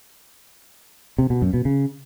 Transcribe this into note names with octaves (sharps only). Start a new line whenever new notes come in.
C3
B2
F#2
B2
C#3